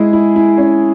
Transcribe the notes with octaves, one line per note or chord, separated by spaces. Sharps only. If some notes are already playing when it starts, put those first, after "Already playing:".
Already playing: G#3 E4 G#4
E4
E4
C#4